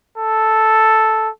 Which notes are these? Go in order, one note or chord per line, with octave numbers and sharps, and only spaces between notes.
A4